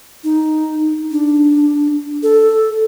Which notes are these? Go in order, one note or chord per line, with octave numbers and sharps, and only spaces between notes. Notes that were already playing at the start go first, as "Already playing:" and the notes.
D#4
D4
A4